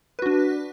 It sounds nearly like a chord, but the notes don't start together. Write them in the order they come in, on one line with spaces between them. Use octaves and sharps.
B4 F#4 D4